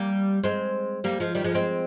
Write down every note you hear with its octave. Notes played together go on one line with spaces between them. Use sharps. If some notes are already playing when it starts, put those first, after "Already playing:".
Already playing: G3 A#3
G#3 C4
G3 A#3
F3 G#3
D#3 G3
F3 G#3
G#3 C4